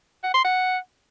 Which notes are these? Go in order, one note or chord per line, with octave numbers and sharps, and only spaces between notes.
F#5
C6
F#5